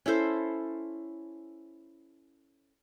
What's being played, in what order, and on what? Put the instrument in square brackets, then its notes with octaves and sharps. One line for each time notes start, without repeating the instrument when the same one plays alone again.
[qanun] C#4 E4 A4 C5